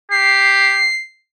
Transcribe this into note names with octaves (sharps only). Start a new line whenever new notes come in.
G4 C7